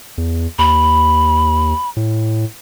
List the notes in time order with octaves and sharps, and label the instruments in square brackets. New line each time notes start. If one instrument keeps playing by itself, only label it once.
[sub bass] E2
[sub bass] D#2 [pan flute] B5
[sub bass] A2